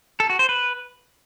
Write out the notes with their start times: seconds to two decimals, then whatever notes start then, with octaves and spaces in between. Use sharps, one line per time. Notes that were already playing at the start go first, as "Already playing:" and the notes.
0.20 A4
0.30 F#4
0.39 C5
0.49 B4